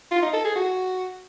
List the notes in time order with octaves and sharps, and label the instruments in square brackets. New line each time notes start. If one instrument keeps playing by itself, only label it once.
[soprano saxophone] F4
D#4
A4
G#4
F#4